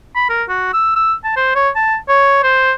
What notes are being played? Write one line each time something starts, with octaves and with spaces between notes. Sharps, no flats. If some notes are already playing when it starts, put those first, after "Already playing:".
B5
A#4
F#4
E6
E6
A5
C5
C#5
A5
C#5
C5